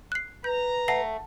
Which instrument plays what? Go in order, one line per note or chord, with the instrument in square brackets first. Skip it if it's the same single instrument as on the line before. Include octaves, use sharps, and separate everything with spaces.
[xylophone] F#6 C7
[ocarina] B4 [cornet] A#5 [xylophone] G6
[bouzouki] A3 [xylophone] F#5 A#6 C7